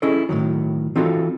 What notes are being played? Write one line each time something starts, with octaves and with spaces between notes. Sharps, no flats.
C#4 E4 G#4 A4 D#5
A2 C3 D#3 F#3
E3 C4 D#4 F4 F#4 A4